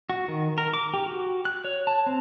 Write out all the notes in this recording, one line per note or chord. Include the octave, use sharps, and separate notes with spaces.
F#4
D#3
A#4
D6
G4
F#4
F#6
C#5
A5
C4